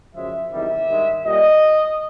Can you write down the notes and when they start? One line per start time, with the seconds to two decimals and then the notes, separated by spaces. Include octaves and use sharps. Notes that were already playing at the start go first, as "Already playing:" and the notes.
0.14 F#2 C#3 F3 G#3 E5
0.51 E2 C3 D#3 G3 E5
0.88 G2 D#3 G#3
1.25 A#2 G3 D#5